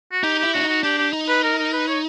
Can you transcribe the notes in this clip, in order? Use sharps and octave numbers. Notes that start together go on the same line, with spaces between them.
F#4
D#4 G4
E4 G4
D4 F#4
D#4
F#4
D4 G4
G4
D#4
B4
A#4
A#4
B4
C#5